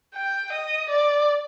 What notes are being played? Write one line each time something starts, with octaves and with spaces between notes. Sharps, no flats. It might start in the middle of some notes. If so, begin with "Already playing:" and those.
G5
D#5
D5